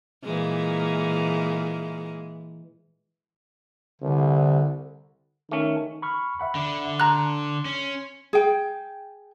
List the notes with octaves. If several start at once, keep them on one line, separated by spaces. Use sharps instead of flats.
A#2 E3 G#3
C2 D3
D#3 A3 C#4
B5 C#6 F6
E5 F#5 B5
D3
A#5 C6 F#6
C#4
G#4 G5